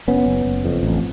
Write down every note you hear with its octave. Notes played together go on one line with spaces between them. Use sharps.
F#1 B3 C#4
F#1
F#1
F2
A1